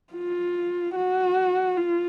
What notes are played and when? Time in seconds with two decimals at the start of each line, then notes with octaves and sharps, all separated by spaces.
0.14 F4
0.95 F#4
1.77 F4